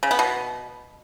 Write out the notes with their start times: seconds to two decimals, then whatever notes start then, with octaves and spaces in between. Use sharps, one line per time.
0.03 C#3
0.11 B3
0.19 B2